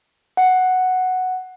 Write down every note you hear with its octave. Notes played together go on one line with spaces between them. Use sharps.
F#5